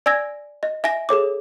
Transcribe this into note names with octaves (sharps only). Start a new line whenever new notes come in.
D5 G#5 E6 G#6 A#6
D#5
E5 G#5 A#6
G#4 A4 C#5 D6